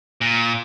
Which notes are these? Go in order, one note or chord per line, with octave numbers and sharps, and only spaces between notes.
A#2